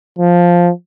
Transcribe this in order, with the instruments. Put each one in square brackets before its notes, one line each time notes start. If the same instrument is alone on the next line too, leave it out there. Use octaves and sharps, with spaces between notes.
[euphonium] F3